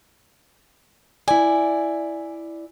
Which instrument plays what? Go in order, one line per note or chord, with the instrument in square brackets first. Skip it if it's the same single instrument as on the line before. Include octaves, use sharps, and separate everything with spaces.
[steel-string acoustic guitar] E4 D5 [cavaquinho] G#5